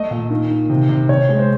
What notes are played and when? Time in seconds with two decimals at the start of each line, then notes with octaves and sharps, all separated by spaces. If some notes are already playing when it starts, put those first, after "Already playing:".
Already playing: A3 D#5
0.11 A#2
0.30 D#3
0.50 D#3
0.70 C3
0.89 C3
1.09 C3 C#5
1.29 G#3
1.39 C5